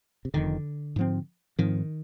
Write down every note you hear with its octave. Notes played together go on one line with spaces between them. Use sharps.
C3
F1 F2 D3 D#3
G#2 F3 C4
G#2 D#3 F3 C4